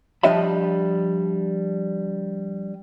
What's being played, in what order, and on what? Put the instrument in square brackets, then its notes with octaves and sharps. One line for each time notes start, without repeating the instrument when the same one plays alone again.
[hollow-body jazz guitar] F3 G3 D4 D#5 E5 B5